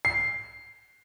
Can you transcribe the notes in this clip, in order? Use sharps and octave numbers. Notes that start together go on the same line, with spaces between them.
C7